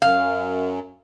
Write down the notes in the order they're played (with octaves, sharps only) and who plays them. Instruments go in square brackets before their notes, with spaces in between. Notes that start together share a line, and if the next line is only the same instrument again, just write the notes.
[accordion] F#2 [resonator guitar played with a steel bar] F5